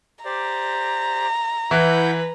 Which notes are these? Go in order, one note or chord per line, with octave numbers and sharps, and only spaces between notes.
G4 C5 D5 A#5
E3 E4 B4 F#5 G6